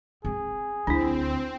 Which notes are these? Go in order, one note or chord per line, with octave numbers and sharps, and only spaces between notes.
C4 G#4
D2 C4 D4 E4